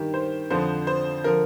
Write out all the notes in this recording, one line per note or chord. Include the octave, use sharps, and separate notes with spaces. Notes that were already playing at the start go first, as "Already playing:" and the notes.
Already playing: G2 D#3 G4
C5
F2 D3 F3 C5
C5
D3 F3 A#4